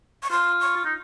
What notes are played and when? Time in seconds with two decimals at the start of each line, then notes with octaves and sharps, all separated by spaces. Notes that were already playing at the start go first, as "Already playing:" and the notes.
0.23 C#6
0.31 F4 C6
0.61 C#6
0.76 F4
0.85 D#4